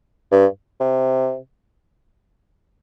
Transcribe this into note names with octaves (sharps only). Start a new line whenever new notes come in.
G2
C3